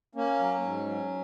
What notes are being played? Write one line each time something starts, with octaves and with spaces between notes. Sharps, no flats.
A#3 C#4
F#3
G#2
F#3